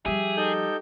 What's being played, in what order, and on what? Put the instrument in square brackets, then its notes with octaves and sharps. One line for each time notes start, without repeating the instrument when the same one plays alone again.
[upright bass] F3 G3 [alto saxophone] G4 [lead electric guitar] G#4 [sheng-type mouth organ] E5
[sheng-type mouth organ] D#4 A4 G6